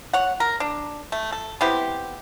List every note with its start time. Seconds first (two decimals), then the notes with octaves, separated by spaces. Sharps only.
0.13 C#5 F#5
0.40 A#4
0.60 D4
1.12 A3
1.32 A4
1.61 B3 C4 E4 G4